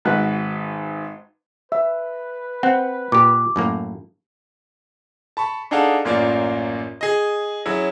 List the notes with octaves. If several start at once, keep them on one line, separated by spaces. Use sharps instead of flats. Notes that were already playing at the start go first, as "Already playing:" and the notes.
G#1 G#2 F#4 B4 F#6
B4 E5
C4 F#5
A#2 G4 D6
F#2 A2 A#3
A5 B5 C#6
D4 D#4 G#4 A4 F5 F#5
A1 F#2 A#3 F4 D5
G#4 D#5
F#3 C#4 E4 G#4